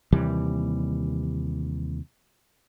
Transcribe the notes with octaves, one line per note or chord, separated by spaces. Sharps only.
D#2 C3 E3 G3